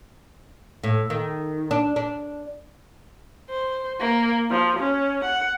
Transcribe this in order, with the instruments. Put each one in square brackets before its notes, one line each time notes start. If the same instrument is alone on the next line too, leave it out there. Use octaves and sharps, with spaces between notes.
[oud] A2
D#3
D4
D4
[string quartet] C5
A#3
F3
C#4
F#5